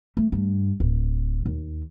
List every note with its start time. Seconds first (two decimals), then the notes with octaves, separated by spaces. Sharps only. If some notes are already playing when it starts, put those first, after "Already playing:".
0.17 A3
0.32 G2
0.80 D1
1.46 D#2